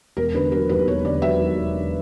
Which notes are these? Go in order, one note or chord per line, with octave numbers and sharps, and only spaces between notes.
E1 A#4
D3 B4
F#3 A#4
D#2 B4
E1 C#5
D3 D5
F#3 E5
D#2
E1
D3